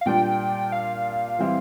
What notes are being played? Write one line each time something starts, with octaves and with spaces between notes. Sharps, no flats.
F5
A#2 G3 D4 F4 G5
F5
E3 G3 C4 E4